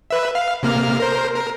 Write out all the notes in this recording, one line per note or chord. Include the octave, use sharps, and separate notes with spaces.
B4 E5
F5
C3 A#3 F6
A#4 C5
A#4